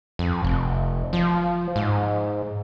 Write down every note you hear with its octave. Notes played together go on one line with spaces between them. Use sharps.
F2
F1
F3
G#2